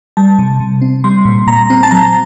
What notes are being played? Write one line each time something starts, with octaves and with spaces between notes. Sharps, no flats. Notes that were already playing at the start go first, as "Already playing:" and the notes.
G3 A5
C3
C3
C4
G3 C6
A#2
A#2 A#5
C4
A5
F#3 A#5